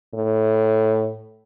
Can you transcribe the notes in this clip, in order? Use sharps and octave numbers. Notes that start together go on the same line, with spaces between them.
A2